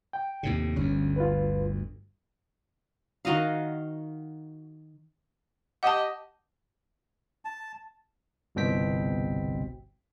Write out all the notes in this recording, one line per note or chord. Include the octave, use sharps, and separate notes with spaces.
G5
D#2 A2 C3
G1 D2 C#4
F4 B4
D#3 F#4 D#5 F5
G4 D#5 F#5 A5
A5
G1 C2 B2 C4 G5 B6